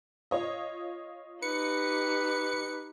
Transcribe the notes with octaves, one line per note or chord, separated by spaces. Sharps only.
F4 C#5 D#5
D#4 G4 B4 C#7